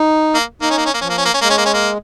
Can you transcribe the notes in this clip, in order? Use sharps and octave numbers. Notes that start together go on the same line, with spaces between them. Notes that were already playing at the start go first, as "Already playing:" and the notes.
Already playing: D#4
A#3
A#3 D#4
C#4
A#3
C#4
A#3
F3 C#4
A#3
C#4
A#3
C#4
G#3 A#3
C#4
A#3
C#4
A#3